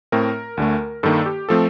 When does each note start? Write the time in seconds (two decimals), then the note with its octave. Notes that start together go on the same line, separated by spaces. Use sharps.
0.12 A2 A3 C4 A#4
0.57 D2 D3 A3
1.03 G2 D#3 A#3 A4
1.26 G4
1.49 F3 A3 C4 A4